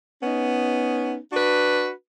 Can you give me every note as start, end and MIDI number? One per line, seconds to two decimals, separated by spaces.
0.23 1.17 59
0.23 1.17 61
0.23 1.17 63
1.33 1.90 62
1.33 1.90 66
1.33 1.90 71